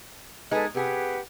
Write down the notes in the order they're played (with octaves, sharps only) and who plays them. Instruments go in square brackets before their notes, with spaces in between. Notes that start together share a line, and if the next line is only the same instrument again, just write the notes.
[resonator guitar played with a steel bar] G#3 D#4 [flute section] A4 B4 G#5
[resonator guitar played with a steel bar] C3 G#4 [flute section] G4 B4 F#5